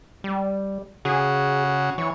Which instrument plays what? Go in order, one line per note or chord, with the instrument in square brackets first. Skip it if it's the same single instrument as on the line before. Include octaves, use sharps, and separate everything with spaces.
[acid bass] G3
[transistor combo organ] C#3 F#4 [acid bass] G#4
[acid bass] E3 [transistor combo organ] C#5